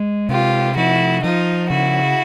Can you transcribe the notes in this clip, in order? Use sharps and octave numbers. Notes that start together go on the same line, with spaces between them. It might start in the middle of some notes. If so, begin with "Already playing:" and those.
Already playing: G#3
C3 F4 G4
F3 E4 F#4
F3 D#4 F4
C#3 E4 F#4